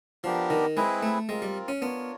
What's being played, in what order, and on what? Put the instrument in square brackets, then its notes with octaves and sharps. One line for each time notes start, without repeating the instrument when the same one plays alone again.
[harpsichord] F3 [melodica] B3 D4 G4 A#4
[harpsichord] D#3
[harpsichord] G#3 [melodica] C4 E4 G#4 B4
[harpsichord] A3
[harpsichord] G#3 [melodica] C4 F4 A#4
[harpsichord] G3
C#4
[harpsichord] B3 [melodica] D4 F4 A#4 C#5